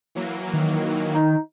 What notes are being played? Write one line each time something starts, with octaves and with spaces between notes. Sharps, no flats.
E3 F#3 A#3
D#3
D#4